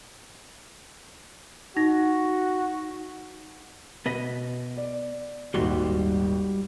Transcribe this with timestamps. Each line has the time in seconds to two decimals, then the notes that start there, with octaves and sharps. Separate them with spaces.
1.77 D#4 F#4 A#6
4.06 B2 B3 B4 D#5
4.77 D5
5.54 D#1 G#1 G3 F#4 C6